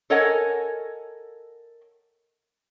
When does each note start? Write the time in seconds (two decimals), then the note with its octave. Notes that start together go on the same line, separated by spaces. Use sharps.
0.10 A4 A#4 C#5 D#5 F#5 G#5